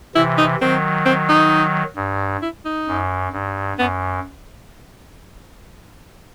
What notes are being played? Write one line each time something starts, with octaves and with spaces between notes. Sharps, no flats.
C3 E3 E4
D#4
D#3 F#3 C4
C4
D#4
G2
E4
D#4
F#2
G2
F#2 B3